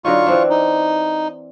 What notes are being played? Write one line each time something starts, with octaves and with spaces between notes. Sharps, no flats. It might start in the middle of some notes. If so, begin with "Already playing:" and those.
D3 F#3 D#4 F4 C#6
E3 C4 D4
D#4